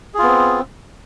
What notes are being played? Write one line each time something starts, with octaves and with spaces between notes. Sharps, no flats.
B3 C4 F4 G#4